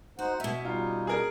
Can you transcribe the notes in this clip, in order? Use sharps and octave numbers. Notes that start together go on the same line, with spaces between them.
D#4 F#4 C5 F#5
B2 C#4 E5
G3 D#4 F4
G#4 A#4